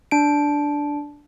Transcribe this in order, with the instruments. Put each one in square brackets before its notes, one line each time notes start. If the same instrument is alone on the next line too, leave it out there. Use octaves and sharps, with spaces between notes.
[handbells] D4 D7